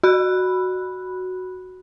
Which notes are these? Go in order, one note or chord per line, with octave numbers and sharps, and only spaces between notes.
F#4 B5 F#6